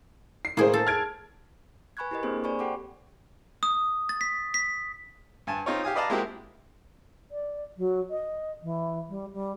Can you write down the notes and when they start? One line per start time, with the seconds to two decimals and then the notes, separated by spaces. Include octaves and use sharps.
0.45 C7
0.57 A2 A#3 G#4 C5
0.74 A4
0.87 F6 G#6 D7
1.97 B4 G#5 B5 C#6 F#6 G#6
2.11 E4 G4 A#4 B4 D#5
2.23 A#3 C4 D4 G4 G#4 C5
2.44 C5 D5 G#5 B5 C#6
2.59 G4 A4 F#5 G5 C6 D6
3.63 D#6
4.09 A6
4.21 B6
4.54 B6
5.47 G2 G#5 A5
5.66 C4 D#4 F4 C#5
5.83 G4 F5 G#5 D#6
5.95 B4 D5 D#5 F5 A5 A#5
6.10 G#3 A#3 C4 E4 F#4 G4
7.31 D5
7.77 F#3
8.10 D#5
8.63 E3
9.09 G3
9.33 G3